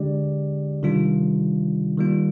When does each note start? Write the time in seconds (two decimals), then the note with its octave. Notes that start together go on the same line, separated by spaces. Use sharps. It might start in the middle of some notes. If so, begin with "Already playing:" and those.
Already playing: D3 G#3 D4 G4 D5
0.83 C3 D#3 G3 D4 F4
1.97 D#3 G3 A#3 F4